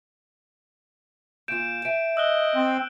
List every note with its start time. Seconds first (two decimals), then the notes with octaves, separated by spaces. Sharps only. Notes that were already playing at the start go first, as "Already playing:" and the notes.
1.48 A#2 F4 G6 D7 E7
1.85 E5 G#5 D7
2.17 D#5 E6 F#6 G7
2.55 C4